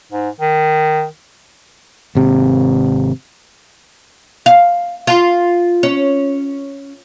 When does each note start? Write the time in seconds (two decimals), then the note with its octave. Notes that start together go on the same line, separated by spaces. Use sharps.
0.12 G#2
0.40 D#3
2.15 G#1 C3
4.46 F5
5.07 F4
5.83 C#4